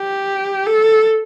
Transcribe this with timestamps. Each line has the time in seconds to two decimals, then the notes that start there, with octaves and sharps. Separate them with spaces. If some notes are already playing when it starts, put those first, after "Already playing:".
Already playing: G4
0.67 A4